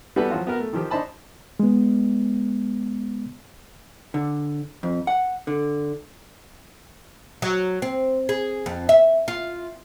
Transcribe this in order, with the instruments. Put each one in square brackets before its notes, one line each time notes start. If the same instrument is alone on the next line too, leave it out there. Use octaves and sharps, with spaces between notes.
[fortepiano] G3 B3 F#4 A4 B4
F3 F#3 F4 F#4
B3 F#4 A#4
A3
D#3 F3 G4
D4 D#4 C5 A5 B5
[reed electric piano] G#3 B3
[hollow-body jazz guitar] D3
F2
F#5
D3
[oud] F#3
C4
G#4
F2
E5
F4